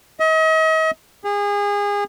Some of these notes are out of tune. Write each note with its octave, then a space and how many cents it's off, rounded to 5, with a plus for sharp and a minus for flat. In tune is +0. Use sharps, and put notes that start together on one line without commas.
D#5 +40
G#4 -30